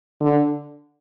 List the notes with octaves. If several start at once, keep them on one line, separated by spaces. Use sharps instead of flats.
D3